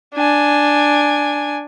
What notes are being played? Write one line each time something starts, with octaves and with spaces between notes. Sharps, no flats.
D4 G#5